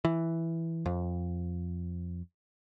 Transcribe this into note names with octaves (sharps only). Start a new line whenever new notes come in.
E3
F2